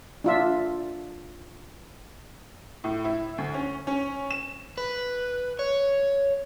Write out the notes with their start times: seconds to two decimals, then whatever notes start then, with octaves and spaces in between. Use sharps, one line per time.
0.24 D4 F4 E5
2.84 A2
3.04 E4
3.38 D2
3.54 C#4
3.87 C#4
4.31 E7
4.78 B4
5.59 C#5